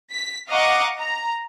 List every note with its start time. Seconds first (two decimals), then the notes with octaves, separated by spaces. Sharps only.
0.12 B6
0.49 D#5 F5 F#5 A#5 C#6 D6
0.99 A#5